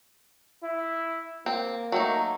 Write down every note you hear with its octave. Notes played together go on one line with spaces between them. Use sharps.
E4
A#3 C4
F#3 A3 D#4